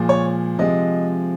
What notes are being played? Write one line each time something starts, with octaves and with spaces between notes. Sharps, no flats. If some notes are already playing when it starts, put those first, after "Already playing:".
Already playing: A#2 F3 G#3
C#5
C3 F3 G#3 D#5